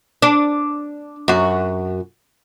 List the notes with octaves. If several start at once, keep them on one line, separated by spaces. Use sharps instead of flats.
D4
F#2 F#4